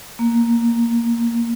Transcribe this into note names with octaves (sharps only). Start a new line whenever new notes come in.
A#3